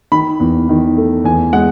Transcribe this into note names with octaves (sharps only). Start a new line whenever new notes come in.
D#3 B5
E2
D#3
A3
E2 G#5
G#3 F#5